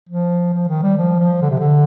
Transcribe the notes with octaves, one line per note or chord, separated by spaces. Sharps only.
F3
F3
D#3
G3
F3
F3
D3
C3
D3